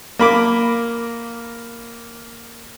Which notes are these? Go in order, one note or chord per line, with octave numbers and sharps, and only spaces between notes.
A#3 B5 D6